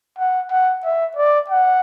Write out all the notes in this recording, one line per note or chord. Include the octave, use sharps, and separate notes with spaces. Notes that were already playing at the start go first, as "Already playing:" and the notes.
F#5
F#5
E5
D5
F#5